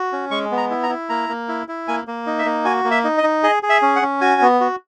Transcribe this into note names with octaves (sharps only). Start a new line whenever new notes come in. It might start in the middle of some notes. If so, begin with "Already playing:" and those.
Already playing: F#4
C#4
G#3 C#6
B3
A#5
E4
A#5
E4
A#3 A#5
A#3
E4
E4
A#3 G#5
A#3
D#4
E5
A#3
F#4 G#5
A#3
E5
D#4
D#5
D#4
G#4 D#5
G#4
E5
C#4
F#5
C#4
F#4 G#5
B3
F#4